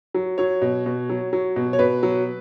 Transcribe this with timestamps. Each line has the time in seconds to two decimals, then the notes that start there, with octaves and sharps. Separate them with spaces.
0.14 F#3
0.38 F#3 C#5
0.62 B2
0.86 B2
1.09 F#3
1.33 F#3
1.56 B2
1.73 C#5
1.79 B2 B4
2.03 F#3